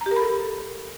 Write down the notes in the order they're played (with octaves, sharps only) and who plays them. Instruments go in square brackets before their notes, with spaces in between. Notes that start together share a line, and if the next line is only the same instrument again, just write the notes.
[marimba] A#5
G4
A#4
B5
A4